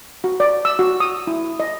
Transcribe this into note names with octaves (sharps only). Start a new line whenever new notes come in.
F#4
D5
E6
F#4
D#6
E4
D#5